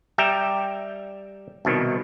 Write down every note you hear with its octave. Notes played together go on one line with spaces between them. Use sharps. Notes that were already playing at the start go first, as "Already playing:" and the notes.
G3 E5 G5 A#5
C2 B2 D#3